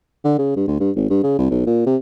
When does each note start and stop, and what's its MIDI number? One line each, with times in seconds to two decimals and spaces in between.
0.25 0.34 50
0.39 0.56 49
0.56 0.65 43
0.68 0.77 38
0.80 0.91 43
0.96 1.06 32
1.10 1.20 43
1.23 1.37 49
1.39 1.49 36
1.50 1.66 35
1.67 1.83 46
1.86 1.97 48